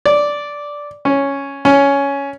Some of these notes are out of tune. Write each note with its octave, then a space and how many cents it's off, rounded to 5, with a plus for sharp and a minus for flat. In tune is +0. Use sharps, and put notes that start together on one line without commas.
D5 -5
C#4 +0
C#4 +10